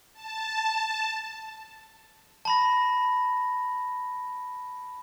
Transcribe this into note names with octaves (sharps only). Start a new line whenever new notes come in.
A5
A5 B5 A#6